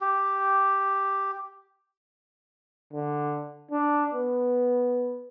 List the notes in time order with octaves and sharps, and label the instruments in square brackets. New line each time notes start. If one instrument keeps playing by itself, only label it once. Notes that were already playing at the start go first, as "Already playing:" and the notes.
[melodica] G4
[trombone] D3
D4
B3